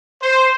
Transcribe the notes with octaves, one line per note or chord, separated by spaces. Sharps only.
C5